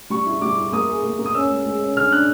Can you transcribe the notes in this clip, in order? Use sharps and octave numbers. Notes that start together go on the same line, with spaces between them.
G3 C#6
E4
G3 D6
E4
A#3 D#6
G#4
A#3
A#3
D#6
C#4 E6
G#3
G#3
C#4
D3 F6
D4 F#6